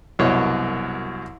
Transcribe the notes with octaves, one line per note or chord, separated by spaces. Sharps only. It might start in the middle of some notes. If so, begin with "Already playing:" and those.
C2 F#2 B2 C#5